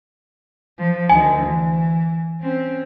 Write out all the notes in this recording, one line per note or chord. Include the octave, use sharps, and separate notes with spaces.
F3
D2 D#3 G#5
E3
C4 C#4